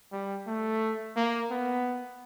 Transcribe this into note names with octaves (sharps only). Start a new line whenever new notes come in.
G3
A3
A#3
B3